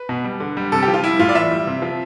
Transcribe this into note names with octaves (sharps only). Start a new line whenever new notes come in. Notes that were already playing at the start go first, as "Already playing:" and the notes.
Already playing: B4
B2
G3
D3
G3
C3 A4
G4
F3
F4
G3 E4
A2 F4
D5
E3 E5
G3
C3
F3